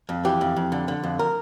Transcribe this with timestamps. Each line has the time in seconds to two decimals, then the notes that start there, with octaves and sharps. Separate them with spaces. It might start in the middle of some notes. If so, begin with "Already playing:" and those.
0.09 F2
0.25 E3 G4
0.41 F2
0.56 F2
0.72 D3
0.88 D3
1.04 F2
1.19 A#4